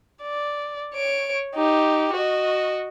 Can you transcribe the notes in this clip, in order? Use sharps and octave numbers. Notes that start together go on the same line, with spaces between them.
D5
C#5 D7
D#4 G4
F#4 D#5